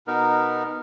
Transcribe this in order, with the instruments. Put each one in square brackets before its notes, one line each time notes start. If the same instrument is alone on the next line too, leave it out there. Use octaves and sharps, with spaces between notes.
[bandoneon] B2 B3 D#4 A#4